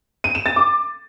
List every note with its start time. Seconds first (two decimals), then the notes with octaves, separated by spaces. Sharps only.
0.24 D#7
0.35 E7
0.46 A6
0.56 D6